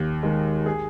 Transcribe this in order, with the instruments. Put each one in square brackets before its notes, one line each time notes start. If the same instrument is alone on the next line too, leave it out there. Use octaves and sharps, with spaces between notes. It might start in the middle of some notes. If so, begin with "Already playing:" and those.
Already playing: [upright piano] D#2
D#3 G#3
G#4